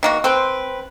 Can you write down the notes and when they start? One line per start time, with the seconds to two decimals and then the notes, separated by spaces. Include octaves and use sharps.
0.03 D#3 A#3 F#4
0.24 C4 B4 G5 C6